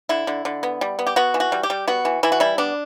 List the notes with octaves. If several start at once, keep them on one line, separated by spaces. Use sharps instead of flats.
D3 E4
D3
D3
B3
G3
B3
G4
B3 F#4
E3
F#4
G3
G4
G3
B3 F#4
E3
E3 E4
F#4
G3 E4
B3 D4